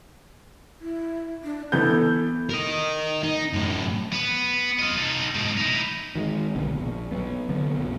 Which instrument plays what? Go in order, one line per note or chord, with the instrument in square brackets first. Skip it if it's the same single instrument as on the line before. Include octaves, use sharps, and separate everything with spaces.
[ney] E4
D4
[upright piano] E3 B3 G6 [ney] A4
[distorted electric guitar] A#4 D#5
D#4
F#2 A2
B3
F4 D#5
D#4 A4
G#2 B2
D#4 E4
[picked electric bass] D#3 F3 G#3
B1 A#2 D3 B3
A#1
F#3 B3
D3 A#3 B3
B1 F#2 A#2